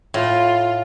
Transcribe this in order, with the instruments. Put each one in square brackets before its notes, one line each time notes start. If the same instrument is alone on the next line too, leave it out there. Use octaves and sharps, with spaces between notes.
[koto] A2 [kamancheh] F4